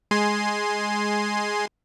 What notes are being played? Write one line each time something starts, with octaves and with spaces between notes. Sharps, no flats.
G#3 G#5 C6